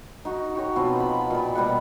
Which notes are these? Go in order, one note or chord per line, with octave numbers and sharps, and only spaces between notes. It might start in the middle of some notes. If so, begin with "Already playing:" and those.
D#4 F#4
F#4 G4 C#5
B2 F3 B3 C4
B5
A#2 B5
B2 G3 D#5 F#5